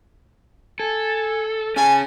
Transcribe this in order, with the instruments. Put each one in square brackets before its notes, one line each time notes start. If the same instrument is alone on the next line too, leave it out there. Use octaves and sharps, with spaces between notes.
[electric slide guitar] A4 [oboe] G#5
[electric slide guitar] C#4 G#4 [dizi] G#5 [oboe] A5